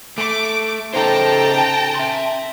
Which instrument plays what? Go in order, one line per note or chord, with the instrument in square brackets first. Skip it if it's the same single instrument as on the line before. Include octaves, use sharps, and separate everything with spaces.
[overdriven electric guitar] A3 [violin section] D6
[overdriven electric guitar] C#3 C5 [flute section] D#4 A4 [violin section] G5 A5 A#5
[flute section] G#5
[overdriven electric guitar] E5 C6